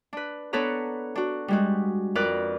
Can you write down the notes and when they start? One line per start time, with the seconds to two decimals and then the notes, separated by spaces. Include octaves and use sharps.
0.13 D4 B4
0.53 B3 D4 A4 B4 C#5 A#5
1.15 D4 F#4
1.48 G3 G#3 F#4
2.15 F2 A#4 B4 D5 F#6